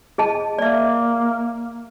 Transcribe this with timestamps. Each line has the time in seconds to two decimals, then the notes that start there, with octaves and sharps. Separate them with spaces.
0.18 G#4 D#5 A5
0.59 A#3 D5 E5